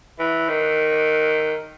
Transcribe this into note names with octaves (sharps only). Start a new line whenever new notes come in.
E3
D#3